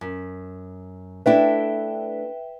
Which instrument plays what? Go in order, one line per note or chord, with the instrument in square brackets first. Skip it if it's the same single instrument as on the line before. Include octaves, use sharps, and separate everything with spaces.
[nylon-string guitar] F#2
[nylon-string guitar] A3 D4 E4 [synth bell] B4 E5 G5